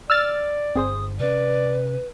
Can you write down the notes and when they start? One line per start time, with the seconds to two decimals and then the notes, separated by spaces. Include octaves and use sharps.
0.10 D5 E6 F6 A6
0.76 G1 C4 G#4 C5 D#6
1.20 C3 C#4 B4 D5